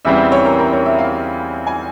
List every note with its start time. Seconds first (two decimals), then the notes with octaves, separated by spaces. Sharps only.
0.05 E2 C#3 E3 G3 C4 E5
0.18 E5
0.32 C#5
0.45 A#4
0.59 A#4
0.73 C#5
0.86 E5
0.99 F5
1.67 G#5